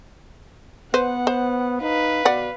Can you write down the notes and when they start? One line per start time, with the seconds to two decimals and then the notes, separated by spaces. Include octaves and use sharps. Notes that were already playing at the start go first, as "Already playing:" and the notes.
0.94 B3 B4 C5 F#5
1.27 C5
1.81 D#4 B4 F5
2.25 B2 D5 F#5